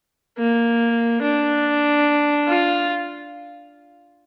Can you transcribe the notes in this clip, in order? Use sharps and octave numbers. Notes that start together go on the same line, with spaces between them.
A#3
D4
F4